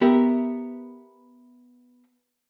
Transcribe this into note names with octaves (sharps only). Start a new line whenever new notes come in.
B3 G4 A#4 E5